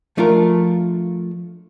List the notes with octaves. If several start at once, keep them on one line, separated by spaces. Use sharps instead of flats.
F3 A3 D4 F4 A#4